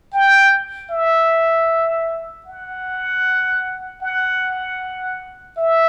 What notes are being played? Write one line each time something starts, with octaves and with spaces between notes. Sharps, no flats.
G5
E5
F#5
F#5
E5